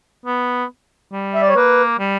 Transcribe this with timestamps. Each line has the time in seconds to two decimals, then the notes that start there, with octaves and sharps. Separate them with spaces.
0.26 B3
1.12 G3
1.34 E5
1.42 D5
1.49 C#5
1.56 A#3 B4
1.99 G3